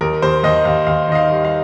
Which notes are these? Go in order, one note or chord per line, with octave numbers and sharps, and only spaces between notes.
D#2 A#4
D#2 C5
D#2 D#5
D#2 F5
D#2 F5
D#3 D#5
F5
G3
F5